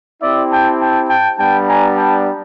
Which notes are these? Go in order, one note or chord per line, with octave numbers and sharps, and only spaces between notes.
C4 E4 G4 D5 E5
G5 A5
G5 A5
G5 A5
G3 B3 D4 G5 A5
G#5 A#5
G5 A5